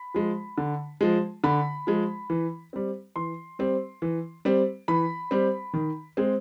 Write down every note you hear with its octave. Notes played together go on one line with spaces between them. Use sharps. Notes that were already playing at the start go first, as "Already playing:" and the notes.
Already playing: B5
F3 G#3
D3
F3 G#3
D3 B5
F3 G#3
E3
G3 C4
E3 C6
G3 C4
E3
G3 C4
E3 B5
G3 C4
D#3
G#3 C4